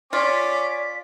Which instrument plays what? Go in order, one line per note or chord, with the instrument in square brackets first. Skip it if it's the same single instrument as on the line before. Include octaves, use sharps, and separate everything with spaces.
[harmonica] C#4 D6 [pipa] F4 [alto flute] D5 [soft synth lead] B6